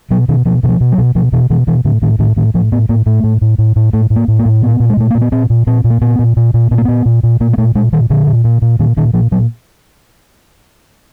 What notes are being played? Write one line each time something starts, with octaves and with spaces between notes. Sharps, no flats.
B2 F#3
B2 D#3
B2 F3
B2 E3
F3
B2
F#3
B2
B2 F3
B2 E3
B2 E3
B2 E3
A2 D3
A2 D#3
A2 D#3
A2 D#3
A2 F3
A2 B3
A2 A#3
A2 A3
A2
A2
A2
A2
A2 A3
A2
A#3
A2
A#3
A2
A#2 B3
A#2
G#3
A#2 A3
A#2 A#3
B3
A#2 C4
A#2
A#2 C4
A#2
A#3
A#2 B3
A#2
A#2
A#2
A#2 B3
A#3
A#2 B3
A#2
A#2
A#2 A#3
A#3
A#2 A3
A#2 G#3
A#2 D#3
A#2 D3
A#2
A#2
A#2
A#2 D#3
A#2 D#3
A#2 F3
A#2 F#3